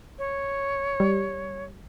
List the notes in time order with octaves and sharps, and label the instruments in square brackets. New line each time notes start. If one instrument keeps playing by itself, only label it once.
[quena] C#5
[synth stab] G3